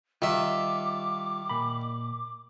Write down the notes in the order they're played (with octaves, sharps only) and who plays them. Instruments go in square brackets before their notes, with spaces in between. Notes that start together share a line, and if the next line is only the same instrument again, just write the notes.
[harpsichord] D#3 E5 [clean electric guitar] G3 F4 [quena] D6
[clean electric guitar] A#2 B5